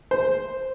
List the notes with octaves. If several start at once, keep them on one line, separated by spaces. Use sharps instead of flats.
C5